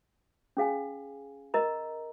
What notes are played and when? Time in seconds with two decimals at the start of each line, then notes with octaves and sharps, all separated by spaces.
0.57 C#4 G#4 F5 G#5
1.54 A#4 D#5 A#5